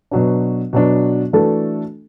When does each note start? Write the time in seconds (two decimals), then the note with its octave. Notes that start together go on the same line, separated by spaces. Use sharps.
0.11 B2 F#3 D4
0.73 B2 F#3 D4
1.33 E3 A3 D4 F#4 A4